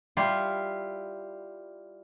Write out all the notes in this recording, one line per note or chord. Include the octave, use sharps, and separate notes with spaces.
G3 E4 F4